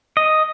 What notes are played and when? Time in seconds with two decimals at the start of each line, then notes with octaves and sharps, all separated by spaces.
0.17 D#5